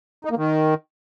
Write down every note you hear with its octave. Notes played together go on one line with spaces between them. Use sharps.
D#4
A#3
D#3